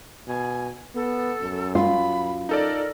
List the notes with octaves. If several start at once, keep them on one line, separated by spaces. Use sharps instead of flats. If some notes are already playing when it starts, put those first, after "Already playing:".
B2 G#5
B3 A4
F#2
F4 B5
D#4 A4 A#4 D5